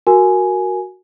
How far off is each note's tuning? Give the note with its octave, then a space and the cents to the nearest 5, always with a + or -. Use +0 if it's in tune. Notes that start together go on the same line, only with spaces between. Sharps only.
F#4 +0 A#4 +0 G#5 +10